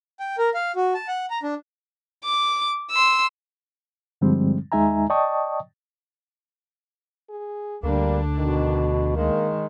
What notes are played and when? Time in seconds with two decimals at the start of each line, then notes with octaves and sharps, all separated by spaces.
0.20 G5
0.38 A#4
0.54 F5
0.76 F#4
0.94 A5
1.08 F#5
1.30 A#5
1.43 D4
2.24 D6
2.91 C6 E6
4.21 G2 D3 F3 G3 G#3 C4
4.72 D#2 G#3 D#4 E5 G#5 A#5
5.10 D5 D#5 G5 A5 C#6 D#6
7.30 G#4
7.83 D2 D3 G3 A#3 D4
8.38 B2 D#3
9.16 D#3 G#3 A#3